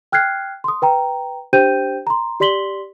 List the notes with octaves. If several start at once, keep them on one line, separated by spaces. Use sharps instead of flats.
G5 F6 F#6 G#6 C7
C6 D#6
B4 G5 A#5
D4 G4 C5 G5 G6 D#7
A#5 C6
G4 D5 C6 B6 F#7 G7